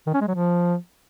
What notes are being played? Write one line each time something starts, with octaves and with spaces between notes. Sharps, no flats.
D#3
C#4
G#3
F#3
F3